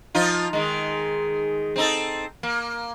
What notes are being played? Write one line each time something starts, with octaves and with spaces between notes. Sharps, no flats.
F3 D#4 F4
D#3 G#3
C4 D#4 A4
A#3